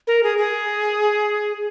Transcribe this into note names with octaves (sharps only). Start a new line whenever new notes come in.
A#4
G#4
G#4